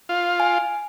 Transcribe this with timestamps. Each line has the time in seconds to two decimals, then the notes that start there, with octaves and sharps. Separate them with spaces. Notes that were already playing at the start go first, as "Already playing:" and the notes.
0.09 F4
0.40 G#5